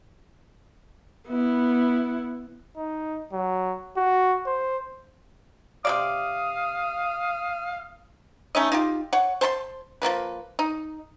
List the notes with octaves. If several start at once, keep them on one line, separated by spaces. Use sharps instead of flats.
B3 E4
D#4
F#3
F#4
C5
C3 G#3 D5 F5 D#6
A3 C#4 D#4 D#5
D#4 F4 G4
C#5 F#5
C5 A5 B5 C6
F3 G3 A#3 B4
D#4